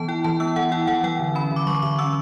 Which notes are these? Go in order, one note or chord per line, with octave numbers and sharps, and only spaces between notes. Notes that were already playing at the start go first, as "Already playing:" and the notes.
Already playing: E3 B3 A5
E4 G5
E3 A5
B3 E6
E3 F#5
E4 G5
E3 F#5
F#3 G5
D3
C#4 B5
D3 D6
F#3 C#6
D3 D6
C#4 E6